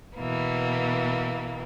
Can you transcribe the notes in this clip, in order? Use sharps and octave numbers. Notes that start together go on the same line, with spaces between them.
B2 E3 A#3 B3